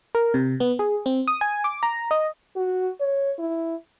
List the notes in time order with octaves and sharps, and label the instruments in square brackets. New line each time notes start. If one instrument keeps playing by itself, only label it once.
[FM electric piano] A#4
C3
B3
G#4
C4
D#6
G#5
D6
A#5
D#5
[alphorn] F#4
C#5
E4